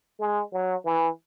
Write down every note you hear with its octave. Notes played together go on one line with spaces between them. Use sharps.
G#3
F#3
E3